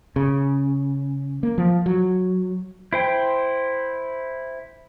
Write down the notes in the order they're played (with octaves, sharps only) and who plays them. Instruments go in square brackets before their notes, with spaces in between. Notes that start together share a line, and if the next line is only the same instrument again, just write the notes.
[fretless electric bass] C#3
A#3
F3
F#3
[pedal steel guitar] E4 C5 G5